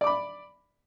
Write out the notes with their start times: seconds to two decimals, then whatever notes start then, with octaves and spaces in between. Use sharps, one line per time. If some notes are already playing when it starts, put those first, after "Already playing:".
0.01 D5
0.04 D6
0.07 B5